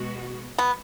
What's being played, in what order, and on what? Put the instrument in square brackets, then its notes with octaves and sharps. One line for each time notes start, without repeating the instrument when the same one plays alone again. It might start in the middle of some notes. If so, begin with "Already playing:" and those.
Already playing: [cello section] B2 G#3 B3 F#4
[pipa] B3